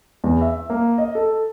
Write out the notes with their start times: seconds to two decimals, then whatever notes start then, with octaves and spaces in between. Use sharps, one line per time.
0.24 E2
0.41 E5
0.70 A#3
0.98 D#5
1.15 A4